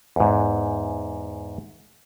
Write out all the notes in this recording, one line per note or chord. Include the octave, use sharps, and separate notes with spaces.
E2 G#2